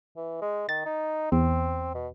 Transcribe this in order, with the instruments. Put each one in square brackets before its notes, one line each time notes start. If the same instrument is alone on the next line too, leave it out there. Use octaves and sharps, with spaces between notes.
[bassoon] E3
G#3
[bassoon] D#3 [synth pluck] A6
[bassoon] D#4
[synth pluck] E2 [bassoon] C4
[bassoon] B2